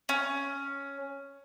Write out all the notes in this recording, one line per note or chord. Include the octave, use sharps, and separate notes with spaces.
C#4